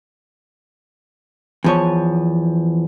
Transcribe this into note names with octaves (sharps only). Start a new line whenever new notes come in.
E2 F3 C#5